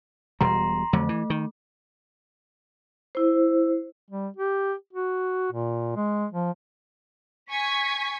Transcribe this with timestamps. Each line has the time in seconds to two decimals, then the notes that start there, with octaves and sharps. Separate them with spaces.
0.41 E1 B2 G3 A#5 C6
0.93 F2 D3 F#3 A3
1.09 E3
1.30 D#3
3.15 E4 C5
4.11 G3
4.37 G4
4.93 F#4
5.52 A#2
5.96 G#3
6.31 F3
7.51 G#5 C#6 G#6 B6